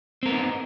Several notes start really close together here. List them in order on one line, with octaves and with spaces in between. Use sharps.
C4 A#4 B3 D#4